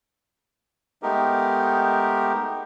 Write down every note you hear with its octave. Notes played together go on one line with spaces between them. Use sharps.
G#3 A3 B3 D#4 G4 A#4